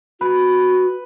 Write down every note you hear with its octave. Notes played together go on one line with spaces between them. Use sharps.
F#4 B4